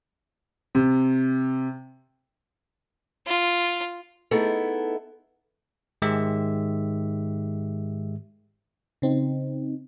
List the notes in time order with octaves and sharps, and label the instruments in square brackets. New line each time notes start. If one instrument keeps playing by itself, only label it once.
[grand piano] C3
[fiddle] F4
[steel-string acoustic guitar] A3 B3 D#4 E4 G#4 A4
[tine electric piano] G#2 D#3 G#3 G4 E5
[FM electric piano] C#3 C4 D#4